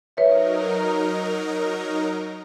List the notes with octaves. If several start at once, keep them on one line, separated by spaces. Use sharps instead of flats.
F#3 D#4 A#4 B4 C#5 E5